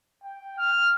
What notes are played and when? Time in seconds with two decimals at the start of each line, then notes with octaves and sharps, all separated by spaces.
0.24 G5
0.58 F6